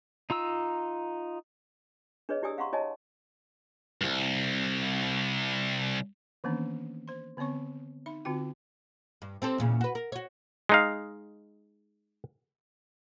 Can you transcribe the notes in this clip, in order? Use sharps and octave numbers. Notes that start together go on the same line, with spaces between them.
D#4 F4 A#5 E6
D4 G#4 B4 C#5 D#5
E4 G4 D5 G#5 D#6 E6
F5 F#5 A#5 C6 C#6
E4 C#5 D#5 G#5 A5
C2 G2
D#3 E3 A#3 B3 C#4 D4
C5 C6
D3 B3 C4 C#5 C#6
D#4 E5 B5
D3 C4 F4 F#4 G5
G2
C4 G4 A4
E2 A#2 C#3
F#4 B4
A#4
F#4 C#5
G#3 D#4 F5